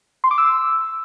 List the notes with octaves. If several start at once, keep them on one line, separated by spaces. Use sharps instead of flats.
C6
D6
E6